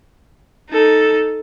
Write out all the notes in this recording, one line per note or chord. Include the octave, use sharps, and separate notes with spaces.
D#4 A4